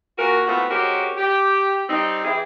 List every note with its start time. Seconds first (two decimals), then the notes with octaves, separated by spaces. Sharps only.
0.18 A#2 F#4 A#4
0.47 A2 A3 B3 C4 F4 F#4
0.69 G#3 C4 C#4 F#4 G4 A#4
1.17 G4
1.89 G3 C4 D#4
2.25 C3 E3 E4 G4 G#4